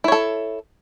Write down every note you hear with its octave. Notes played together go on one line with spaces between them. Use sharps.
E4 A4 C#5